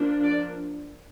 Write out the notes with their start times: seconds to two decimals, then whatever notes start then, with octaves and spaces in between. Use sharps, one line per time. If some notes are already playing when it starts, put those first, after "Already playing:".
Already playing: F3 A#3 D4
0.24 D5